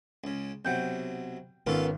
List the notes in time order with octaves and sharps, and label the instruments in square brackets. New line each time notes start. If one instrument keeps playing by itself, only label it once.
[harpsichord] C#2 C#3
[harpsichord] B1 C3 F#3 [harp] F#5 G5 G6
[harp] G#1 [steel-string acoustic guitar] B3 C#4 A#4 [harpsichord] F4 A4 F5